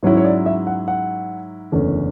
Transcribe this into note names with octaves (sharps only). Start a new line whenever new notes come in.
G#2 F#3 C#4 E4 C#5
C#5
D5
E5
F#5
F#5
F#1 E2 D3 A3 C#4